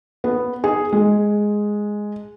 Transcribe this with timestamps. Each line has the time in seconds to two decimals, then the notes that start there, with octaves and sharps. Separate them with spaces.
0.24 B3
0.64 G#4
0.93 G#3